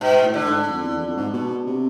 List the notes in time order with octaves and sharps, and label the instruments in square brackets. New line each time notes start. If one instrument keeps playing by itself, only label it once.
[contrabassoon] G#2 [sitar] B2
[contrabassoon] A2
[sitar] D3
[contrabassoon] G#2
F2
E2
F2
G#2
B2
C3